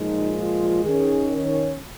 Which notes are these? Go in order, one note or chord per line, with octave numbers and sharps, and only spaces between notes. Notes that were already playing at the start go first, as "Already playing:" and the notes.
Already playing: A#2 F3 G#3 D#4
F4
D#3 C#4 G#4
C#5